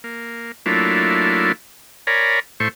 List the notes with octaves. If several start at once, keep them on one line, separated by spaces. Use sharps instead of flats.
A#3
F#3 A3 A#3 D4 E4 F4
A#4 C#5 D5 G#5 A#5 B5
A2 A3 C5 C#6